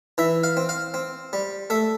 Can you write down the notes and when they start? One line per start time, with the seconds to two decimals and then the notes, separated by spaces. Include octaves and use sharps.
0.18 E3 E5
0.43 F5
0.57 C4
0.69 F5
0.94 C4
1.33 G3
1.70 A3 E5